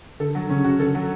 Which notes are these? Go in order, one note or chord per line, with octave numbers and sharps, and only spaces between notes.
D3 A4
F#3
C#3 C#4
F#4
D3 A4
F#3